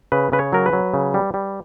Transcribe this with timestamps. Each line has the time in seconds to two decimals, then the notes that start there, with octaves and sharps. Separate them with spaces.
0.12 C#3 B4
0.32 C#3 B4
0.39 C#5
0.53 F#3 A#4
0.66 B4
0.73 F#3
0.94 C#3
1.14 G3
1.34 G3